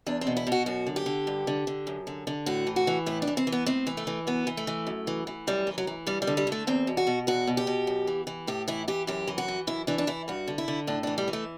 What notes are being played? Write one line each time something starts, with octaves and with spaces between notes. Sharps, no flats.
E2 D4
C4
B2
E4
B2
F#4
F#2 F#4
D3
G4
D3
G2
D3
D3
F#2
D3
D3
A2 F#4
E3
F#4
E3
A2 E4
D4
E3
C4
E3
B3
A2 C4
E3
A3
E3
F#2 B3
E3
A3
E3
F#2
E3
E3
F#2 G3
E3
F#3
E3
G2 G3
G3
D3
G3
D3
A3
E2 C4
B2
F#4
B2
E2 F#4
B2
G4
B2
F#2
E3
E3
A2 G4
E3 E4
E3 G4
F#2 G4
E3
F#4
E3
F#2 E4
E3 D4
D4
E3 E4
G2 F#4
D3
E4
D3
A2 D4
E3 D4
G3
E3
A3